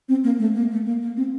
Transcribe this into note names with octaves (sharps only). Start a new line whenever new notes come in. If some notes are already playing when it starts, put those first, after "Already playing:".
C4
A#3
A3
A#3
A3
A#3
A#3
C4